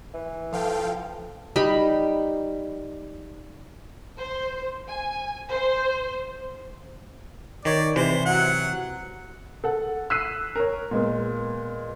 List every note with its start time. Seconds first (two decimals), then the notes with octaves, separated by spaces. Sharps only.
0.14 E3
0.52 F3 A4 F5 G5
1.56 G3 D#4 B5
4.17 C5
4.89 G#5
5.51 C5
7.65 D#3 C#5 D5
7.96 C3 E3 C5
8.26 F#3 F#5
9.64 A4 F#5
10.10 E6 F#6 B6 C7 D#7
10.56 A#4 C#5
10.91 A#2 G#3 B3